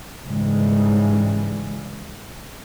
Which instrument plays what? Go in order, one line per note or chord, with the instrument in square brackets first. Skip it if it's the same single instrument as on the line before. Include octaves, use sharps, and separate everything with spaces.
[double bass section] G#2 C#3 E3 G3 G#3